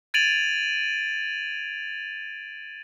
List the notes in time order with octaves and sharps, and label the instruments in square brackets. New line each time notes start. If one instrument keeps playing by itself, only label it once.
[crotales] G#6 A6 D7 D#7 F7 F#7